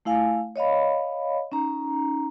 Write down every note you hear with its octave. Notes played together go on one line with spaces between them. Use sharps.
A3 E4 F5 G#5
C#5 D#5 F5 B5
C#4 D#4 A#5